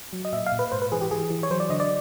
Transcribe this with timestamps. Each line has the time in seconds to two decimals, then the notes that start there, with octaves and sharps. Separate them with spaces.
0.13 F#3
0.25 D#5
0.33 A#2 E5
0.46 F5
0.52 A#2
0.59 B4
0.72 G#2 C5
0.82 B4
0.92 E3 G#4
1.01 G4
1.11 E3 G#4
1.30 E3
1.43 C#5
1.50 F#3 C5
1.60 D5
1.70 D3 D#5
1.80 D5